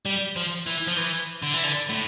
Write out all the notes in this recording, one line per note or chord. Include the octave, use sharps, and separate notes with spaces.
G3
F3
E3
F3
E3
D3
E3
D3
A2